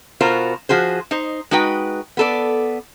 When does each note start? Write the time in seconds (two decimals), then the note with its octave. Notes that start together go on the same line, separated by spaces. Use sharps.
0.20 B2 F4 F#4 A#4 C5
0.69 F3 F#4 G#4 C5
1.11 D#4 C5
1.51 G#3 D#4 F#4 B4 G5
2.17 B3 A4 D5